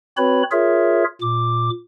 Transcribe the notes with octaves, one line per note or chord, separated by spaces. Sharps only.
C4 F#4 B4 C#5 B5
F4 G#4 A#4 C#5 E5
A#2 D6